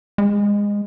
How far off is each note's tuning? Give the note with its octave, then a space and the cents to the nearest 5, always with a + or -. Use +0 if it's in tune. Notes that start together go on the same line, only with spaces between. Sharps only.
G#3 -20